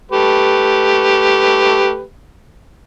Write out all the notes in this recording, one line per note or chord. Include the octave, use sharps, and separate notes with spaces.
A3 G4 B4